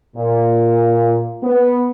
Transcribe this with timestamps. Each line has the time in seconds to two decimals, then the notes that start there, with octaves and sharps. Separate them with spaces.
0.16 A#2
1.43 B3